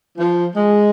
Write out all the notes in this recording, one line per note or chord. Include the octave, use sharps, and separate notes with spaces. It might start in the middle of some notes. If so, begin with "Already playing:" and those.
F3
G#3